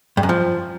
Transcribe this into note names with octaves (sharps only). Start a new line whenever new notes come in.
G2
F#2
F3